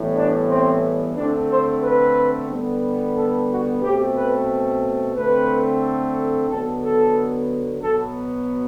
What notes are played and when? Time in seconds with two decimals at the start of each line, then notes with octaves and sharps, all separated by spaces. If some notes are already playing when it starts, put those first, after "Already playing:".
Already playing: A2 E3 G3 B3
0.15 D4
0.49 C4
1.16 D3 A3 C4 D4
1.49 C5
1.83 B4
2.49 D3 G3 B3
3.16 A4
3.50 F#4
3.82 B2 A3 C4 G4
4.17 B4
5.16 D3 A3 C4 B4
6.49 D3 F#3 B3 A4
6.83 A4
7.82 B2 F#3 B3 A4